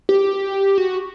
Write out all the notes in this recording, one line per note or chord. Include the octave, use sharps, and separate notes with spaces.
G4
F#4